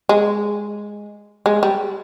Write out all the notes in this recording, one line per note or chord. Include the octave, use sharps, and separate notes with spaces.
G#3
G#3
G3